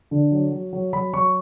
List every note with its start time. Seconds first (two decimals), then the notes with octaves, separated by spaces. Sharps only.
0.11 D3
0.32 F#3
0.52 F#3
0.73 F#3
0.93 F#3 B5
1.13 F#3 C#6